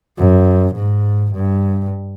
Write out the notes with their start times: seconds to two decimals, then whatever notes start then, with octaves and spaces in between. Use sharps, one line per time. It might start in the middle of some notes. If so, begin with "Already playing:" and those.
0.18 F#2
0.76 G#2
1.34 G2